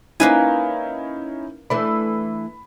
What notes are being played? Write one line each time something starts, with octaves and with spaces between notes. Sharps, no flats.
A#3 C#4 D#4 E4 B4 G#5
E3 A3 D4 B5